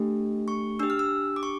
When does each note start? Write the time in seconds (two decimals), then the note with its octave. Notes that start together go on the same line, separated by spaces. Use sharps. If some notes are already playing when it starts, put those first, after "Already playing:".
Already playing: A3 D4 G4
0.48 C#6
0.79 D4 G4 E6
0.90 F6
0.99 E6
1.36 D6
1.43 C#6